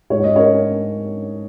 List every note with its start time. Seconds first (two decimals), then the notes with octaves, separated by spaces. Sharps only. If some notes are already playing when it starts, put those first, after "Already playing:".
0.10 G#2 C#5
0.24 D#5
0.35 C#4 A#4 C#5